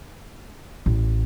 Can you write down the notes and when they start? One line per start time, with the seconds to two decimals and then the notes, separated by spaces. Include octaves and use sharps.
0.86 A1